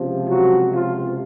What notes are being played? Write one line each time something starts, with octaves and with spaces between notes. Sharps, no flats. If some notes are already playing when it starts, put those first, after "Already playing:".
Already playing: C#2 C3 F3
F#3 F#4
F3 F4